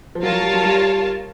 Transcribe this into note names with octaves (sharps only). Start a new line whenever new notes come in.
F3
F#3 F4 A#4 C#5 F5 A5
F#3
G3
F#3
G3